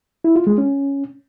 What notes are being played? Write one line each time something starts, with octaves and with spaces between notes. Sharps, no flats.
E4
F4
G#3
C#4